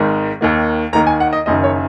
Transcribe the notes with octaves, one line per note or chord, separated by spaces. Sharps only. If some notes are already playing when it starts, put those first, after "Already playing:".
Already playing: G#1 G#2 D#3
D#2 D#3 A#3
D#2 D#3 A#3 A#5
G#5
F#5
D#5
F#1 F#2 D#3 D#5
C#5